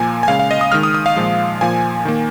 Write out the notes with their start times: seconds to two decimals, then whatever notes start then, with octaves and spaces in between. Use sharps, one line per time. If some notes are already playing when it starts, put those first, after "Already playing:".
Already playing: A#2 F3 A#3 G#5
0.23 G#5
0.28 C#3 G#3 F5
0.39 F5
0.51 D#5
0.61 D#6
0.72 D#3 G#3 F6
0.83 D#6
0.94 D#6
1.06 F5
1.16 A#2 F3 G#3
1.61 A#2 F3 A#3 G#5
2.05 D#3 A#3